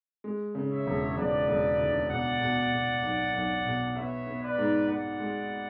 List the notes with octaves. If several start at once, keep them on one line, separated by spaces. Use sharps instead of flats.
G#3
C#3
C#5 E5
E1
E1 B4 D5
E1
D2
B2 D5 F#5
B2
B2
B1
B1
B2
B3 C#5 E5
B3
B4 D5
G#2
G#2 D5 F#5
G#3